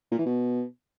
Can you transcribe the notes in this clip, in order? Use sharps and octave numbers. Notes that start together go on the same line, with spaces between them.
A#2
E3
B2